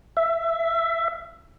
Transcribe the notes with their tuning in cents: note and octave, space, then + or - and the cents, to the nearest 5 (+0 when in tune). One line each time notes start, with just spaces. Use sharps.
E5 +15